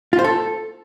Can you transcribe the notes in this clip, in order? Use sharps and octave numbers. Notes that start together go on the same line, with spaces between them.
F4
C5
A4